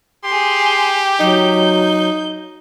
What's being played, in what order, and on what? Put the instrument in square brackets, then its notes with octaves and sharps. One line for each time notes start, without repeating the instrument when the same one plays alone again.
[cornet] G4 [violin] G#4 C6
[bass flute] F#3 [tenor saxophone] D#4 [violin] G6